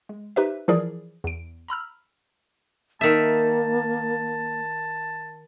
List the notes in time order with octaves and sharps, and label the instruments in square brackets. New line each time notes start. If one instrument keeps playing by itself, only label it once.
[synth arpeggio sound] G#3
D#4 G4 B4 C5 E5
E3 F3 E4 G#4 A#4 D5
E2 D7
A#5 B5 E6 F6
[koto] D#3 E5 [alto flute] A#3 [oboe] A5